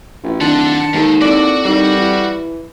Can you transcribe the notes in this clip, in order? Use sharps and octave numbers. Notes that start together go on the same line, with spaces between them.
A1 F4
D1 D#3 D4 A4 F#5 A5 C6
D#2 D#3 G#3 A4
C4 E4 F#4 A4 D5
D#3 G3
E3